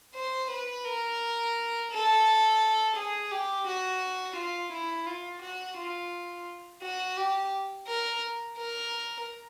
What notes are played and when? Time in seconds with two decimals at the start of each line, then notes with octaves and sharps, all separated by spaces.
0.15 C5
0.51 B4
0.85 A#4
1.92 A4
2.96 G#4
3.31 G4
3.67 F#4
4.36 F4
4.72 E4
5.06 F4
5.42 F#4
5.77 F4
6.82 F#4
7.17 G4
7.88 A#4
8.58 A#4